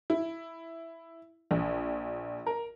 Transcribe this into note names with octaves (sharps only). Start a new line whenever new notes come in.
E4
A#1
A#4